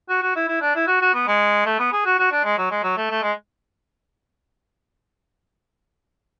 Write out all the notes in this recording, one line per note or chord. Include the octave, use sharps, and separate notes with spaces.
F#4
F#4
E4
E4
D4
E4
F#4
F#4
B3
G#3
A3
B3
G#4
F#4
F#4
D4
G#3
F#3
G#3
F#3
A3
A3
G#3